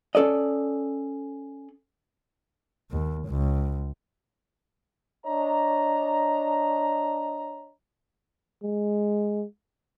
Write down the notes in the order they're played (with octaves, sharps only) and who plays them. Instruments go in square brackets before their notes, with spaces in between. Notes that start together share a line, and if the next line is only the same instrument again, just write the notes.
[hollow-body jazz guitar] C#4 A4 D5 D#5
[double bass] D#2
C#2
[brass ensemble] D4 C#5 D#5 A#5
[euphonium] G#3